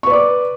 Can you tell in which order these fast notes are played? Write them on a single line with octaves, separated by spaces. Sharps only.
C#6 B4 D5 D6